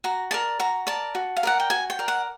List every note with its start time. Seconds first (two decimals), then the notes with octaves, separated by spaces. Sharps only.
0.04 F#4 A#5
0.31 A#4 D5 A5
0.60 F#4 A#5
0.87 A#4 D5 A5
1.15 F#4
1.36 F5
1.43 A#4 D5 F#5
1.60 G5
1.70 F#4 G#5
1.90 G5
1.99 A#4 D5
2.08 F#5